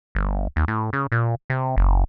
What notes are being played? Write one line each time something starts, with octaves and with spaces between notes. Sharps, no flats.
G1
D#2
A2
C#3
A#2
C3
F#1